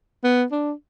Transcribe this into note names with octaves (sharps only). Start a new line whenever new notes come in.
B3
D4